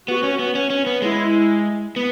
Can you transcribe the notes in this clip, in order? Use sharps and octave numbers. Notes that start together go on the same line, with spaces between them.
B3 F#4
C#4
B3
C#4
C#4
B3
G#3 E4
B3